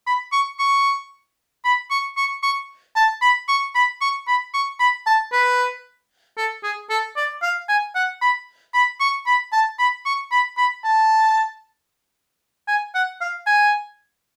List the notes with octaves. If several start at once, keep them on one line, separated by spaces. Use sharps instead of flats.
B5
C#6
C#6
B5
C#6
C#6
C#6
A5
B5
C#6
B5
C#6
B5
C#6
B5
A5
B4
A4
G#4
A4
D5
F5
G#5
F#5
B5
B5
C#6
B5
A5
B5
C#6
B5
B5
A5
G#5
F#5
F5
G#5